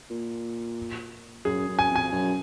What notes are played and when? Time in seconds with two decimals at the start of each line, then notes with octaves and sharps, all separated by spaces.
0.10 A#2
1.45 F#2 G#4
1.68 F#2
1.79 G#5
1.90 F2
1.96 G#5
2.12 F#2